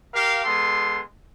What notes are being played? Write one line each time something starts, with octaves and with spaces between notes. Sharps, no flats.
G4 A#4 F5
G#3 B3 A4 C6